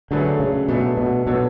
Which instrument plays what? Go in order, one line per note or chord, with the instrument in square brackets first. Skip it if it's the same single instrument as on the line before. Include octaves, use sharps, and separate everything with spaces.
[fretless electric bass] D3 [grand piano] F#3 A3 D4 G#4 B4
[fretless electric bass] C#3
[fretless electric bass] B2 [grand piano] F#3 A3 D4 G#4 B4
[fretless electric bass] B2
[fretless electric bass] B2 [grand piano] F#3 B3 D4 A4 C#5